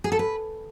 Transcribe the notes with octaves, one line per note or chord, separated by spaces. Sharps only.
G#4
A4
B4